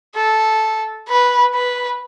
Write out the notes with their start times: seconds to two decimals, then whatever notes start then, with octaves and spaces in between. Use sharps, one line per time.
0.15 A4
1.08 B4
1.54 B4